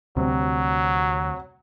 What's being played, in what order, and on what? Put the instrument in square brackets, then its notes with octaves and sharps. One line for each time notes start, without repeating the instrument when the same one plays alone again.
[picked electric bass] D2 [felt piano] C3 G3 C4 [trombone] F#3